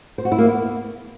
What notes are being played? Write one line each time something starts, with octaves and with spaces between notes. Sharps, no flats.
C5
F#4
E4
A#3
B3